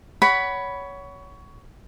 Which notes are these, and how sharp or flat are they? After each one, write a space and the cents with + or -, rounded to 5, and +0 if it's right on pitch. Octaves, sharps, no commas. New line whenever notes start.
C#5 +20 F#5 +20 B5 +0